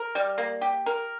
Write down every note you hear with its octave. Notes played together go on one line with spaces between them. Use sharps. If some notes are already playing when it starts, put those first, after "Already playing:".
Already playing: A#4
G3
A#3
G4
A#4